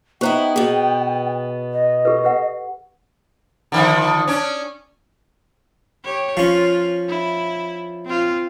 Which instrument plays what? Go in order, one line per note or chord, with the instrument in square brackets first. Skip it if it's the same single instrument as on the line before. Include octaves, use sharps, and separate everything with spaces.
[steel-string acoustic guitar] B3 D#4 E4 [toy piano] G4 C5 A#5 [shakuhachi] G5
[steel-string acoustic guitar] B2 B3 [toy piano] G#4
[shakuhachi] D#5
[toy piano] G4 A4 B4
G4 B4 F#5
[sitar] D3 D#3 F3
C#4 D4
[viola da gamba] G4 C#5
[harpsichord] F3 C#4 [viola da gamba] F4
[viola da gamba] E4
C4 F4